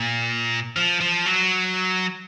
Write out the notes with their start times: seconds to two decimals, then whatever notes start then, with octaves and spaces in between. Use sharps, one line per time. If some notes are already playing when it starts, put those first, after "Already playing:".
Already playing: A#2
0.76 F3
1.01 F3
1.26 F#3